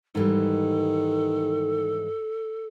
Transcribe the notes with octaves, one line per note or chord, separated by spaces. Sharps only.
G#2 D#3 E3 G3 A4